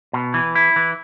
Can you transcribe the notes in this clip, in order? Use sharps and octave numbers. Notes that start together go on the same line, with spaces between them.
B2
E3
E4
E3